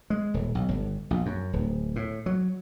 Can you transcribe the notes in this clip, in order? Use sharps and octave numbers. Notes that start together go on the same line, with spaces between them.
G#3
D#1
B1
G1
A#1
F#2
D1
A2
F#3